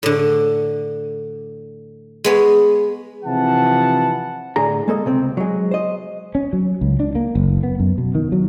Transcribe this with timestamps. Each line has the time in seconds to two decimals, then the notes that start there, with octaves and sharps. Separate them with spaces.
0.03 A2 D3
2.24 G#3 B3 C#5
3.25 C3 E3 F3 F#5 A5
4.56 A2 D3 G#4 A#5
4.88 G#3 A#3 A4 D#5
5.05 C#2 C3 C4
5.37 F#3 G#3
5.71 C5 D#5
6.35 C#4
6.53 F#3
6.81 C#2
7.00 D4
7.15 A#3
7.35 F#1
7.63 B3
7.80 F#2
7.98 B2
8.15 D#3
8.32 F#3